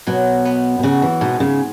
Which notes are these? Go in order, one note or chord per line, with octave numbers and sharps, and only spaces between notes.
B2 F#3
B3
B2
C#3 F#4
E3
G#2 B2
C#3